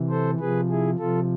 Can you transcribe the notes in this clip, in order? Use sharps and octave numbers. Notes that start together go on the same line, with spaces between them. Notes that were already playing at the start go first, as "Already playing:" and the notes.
Already playing: C3 E3
A4 C5
C3 F3 G#4 B4
E4 G#4
C3 F3 F4 A4